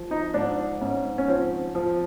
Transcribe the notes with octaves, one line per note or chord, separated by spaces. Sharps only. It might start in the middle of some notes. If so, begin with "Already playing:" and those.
Already playing: F3
D#4
G#2 D4
G#2 C#4
C#4
F3 C4
F3